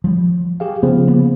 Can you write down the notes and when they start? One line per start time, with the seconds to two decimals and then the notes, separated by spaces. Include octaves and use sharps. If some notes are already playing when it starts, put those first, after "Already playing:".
0.04 F3 G3
0.60 G4 G#4 F5
0.83 C#3 F3 B3
1.08 A#3 B3